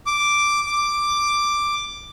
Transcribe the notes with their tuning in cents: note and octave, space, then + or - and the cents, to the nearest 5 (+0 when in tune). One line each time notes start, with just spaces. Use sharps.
D6 +0
D6 +5